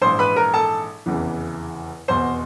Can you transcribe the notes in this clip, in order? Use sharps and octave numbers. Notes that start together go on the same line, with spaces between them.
A#1 G#2 E3 C5 C6
B4 B5
A#4 A#5
A4 A5
F1 E2 C#3 E3
F1 E2 B2 C5 C6